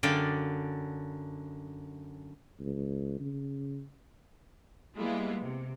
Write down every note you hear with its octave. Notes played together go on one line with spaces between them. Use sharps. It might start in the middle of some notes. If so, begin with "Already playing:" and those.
F#2 D3 D5 F5 G5
C#2
C#3
G3 G#3 A#3 B3 E4 F4
C3